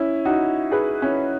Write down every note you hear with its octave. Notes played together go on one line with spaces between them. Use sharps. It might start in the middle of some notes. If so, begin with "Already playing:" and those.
Already playing: C#4 E4
D#4 F#4
G#4 B4
C#4 E4